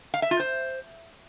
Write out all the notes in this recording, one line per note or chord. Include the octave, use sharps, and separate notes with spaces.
F5
E5
F4
C5